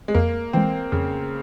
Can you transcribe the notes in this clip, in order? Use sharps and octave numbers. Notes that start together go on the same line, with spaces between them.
G#3
F2 A#3
E3 G#3 C4
F2 C#3